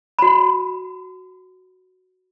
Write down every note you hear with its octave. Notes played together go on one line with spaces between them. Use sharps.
F#4 B5